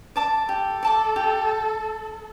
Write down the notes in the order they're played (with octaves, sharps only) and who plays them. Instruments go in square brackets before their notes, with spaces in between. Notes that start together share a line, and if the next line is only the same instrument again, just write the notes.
[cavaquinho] D5 A5 D6
[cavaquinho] G4 [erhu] A4
[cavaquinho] D5 A5 D6
G4